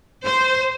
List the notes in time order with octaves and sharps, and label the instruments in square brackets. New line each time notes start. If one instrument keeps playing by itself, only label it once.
[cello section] C5